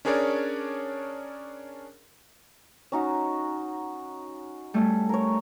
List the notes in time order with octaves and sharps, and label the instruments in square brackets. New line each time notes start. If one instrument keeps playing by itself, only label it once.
[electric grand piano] C#4 D4 G#4 A#4 C#5 D5
[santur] C#4 D#4 F#4
[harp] G3 A3 C#4
[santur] A#4 C#5